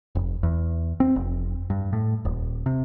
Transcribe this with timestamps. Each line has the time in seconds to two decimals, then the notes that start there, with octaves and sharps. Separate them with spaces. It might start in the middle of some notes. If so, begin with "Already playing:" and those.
0.15 F1
0.43 E2
1.00 C4
1.16 F1
1.70 G2
1.93 A2
2.25 D#1
2.66 C3